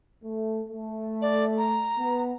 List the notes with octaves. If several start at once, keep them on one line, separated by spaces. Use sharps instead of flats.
A3
A3
D5
A#5
B3